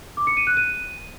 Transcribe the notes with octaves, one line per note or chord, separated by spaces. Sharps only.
D6
C#7
D#7
F#6
D#7